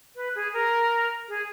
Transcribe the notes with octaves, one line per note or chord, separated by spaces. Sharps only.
B4
G#4
A#4
G#4